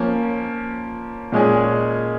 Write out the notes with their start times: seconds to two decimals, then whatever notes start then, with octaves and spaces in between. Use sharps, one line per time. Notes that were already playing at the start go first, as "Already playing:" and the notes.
Already playing: F3 A#3 C#4
1.32 A#2 G#3 C#4 G#4